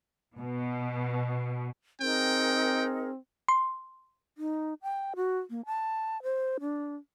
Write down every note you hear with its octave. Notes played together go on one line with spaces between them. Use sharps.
B2
C4 D#4 G#4 A#4 G5
C6
D#4
G5
F#4
A#3
A5
C5
D4